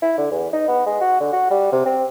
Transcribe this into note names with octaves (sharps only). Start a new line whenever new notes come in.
E4
D3
E2
D#4
B3
G#3
F#4
D3
F#4
G3
C3
C4